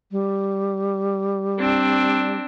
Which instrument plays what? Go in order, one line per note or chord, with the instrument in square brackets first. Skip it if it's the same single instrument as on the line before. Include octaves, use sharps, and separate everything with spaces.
[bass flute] G3
[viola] C4 D4